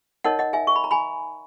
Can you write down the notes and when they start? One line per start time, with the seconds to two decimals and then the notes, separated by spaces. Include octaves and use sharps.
0.24 D#4 A#4 C#5 D#5 F#5
0.39 D#5 F#5
0.53 E5 G#5
0.67 C#6
0.76 B5
0.84 A#5
0.91 G#5 B5